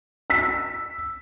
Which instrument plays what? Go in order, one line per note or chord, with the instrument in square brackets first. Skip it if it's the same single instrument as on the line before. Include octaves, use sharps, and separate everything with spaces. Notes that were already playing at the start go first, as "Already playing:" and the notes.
[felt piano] E6 B6